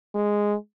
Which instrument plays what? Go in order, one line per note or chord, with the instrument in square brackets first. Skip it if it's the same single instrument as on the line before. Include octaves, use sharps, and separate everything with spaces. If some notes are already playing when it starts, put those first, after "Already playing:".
[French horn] G#3